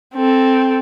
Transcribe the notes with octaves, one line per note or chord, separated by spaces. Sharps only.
C4 A4